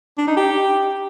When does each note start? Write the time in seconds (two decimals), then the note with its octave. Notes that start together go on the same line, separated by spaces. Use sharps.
0.18 D4
0.27 D#4
0.37 G4